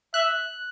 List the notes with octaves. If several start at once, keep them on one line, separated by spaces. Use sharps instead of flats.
E5 F#6